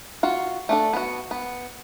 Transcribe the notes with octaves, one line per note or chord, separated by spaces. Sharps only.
F4 F#4
A3 D4 A4
B3 F#4
B3